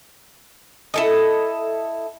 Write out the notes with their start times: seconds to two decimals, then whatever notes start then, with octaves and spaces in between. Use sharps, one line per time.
0.94 E4 A4 D#5